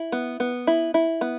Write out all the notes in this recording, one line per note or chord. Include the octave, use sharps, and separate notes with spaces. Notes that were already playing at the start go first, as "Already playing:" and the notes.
Already playing: E4
B3
B3
E4
E4
B3